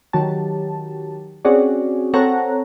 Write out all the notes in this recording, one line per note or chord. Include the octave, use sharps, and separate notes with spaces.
D#3 F#3 G4 A5
C4 C#4 F#4 G#4 D5
C4 A4 C#5 F#5 A#5